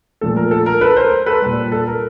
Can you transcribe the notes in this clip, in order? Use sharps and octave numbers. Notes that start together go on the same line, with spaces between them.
A#2 F3 A3 A4
A#4
A4
A#4
A4 B4
A#4 C5
A4 B4
A#2 G3
A4
A#4